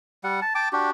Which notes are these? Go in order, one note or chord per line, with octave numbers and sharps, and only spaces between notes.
G3 F#5
A5
G5 A5 D6
D4 F#4 G4